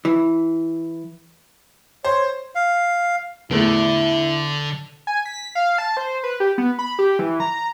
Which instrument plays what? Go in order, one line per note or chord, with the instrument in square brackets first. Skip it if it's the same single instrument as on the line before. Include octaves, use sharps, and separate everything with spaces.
[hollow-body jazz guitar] E3
[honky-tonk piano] C5 [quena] C#5
[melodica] F5
[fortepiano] E2 A2 A3 [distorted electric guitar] D3 [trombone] E4
[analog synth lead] G#5
B6
F5
A5
C5
B4
G4
B3
B5
G4
E3
A#5